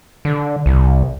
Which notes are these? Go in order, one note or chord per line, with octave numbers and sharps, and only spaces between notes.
D3
C2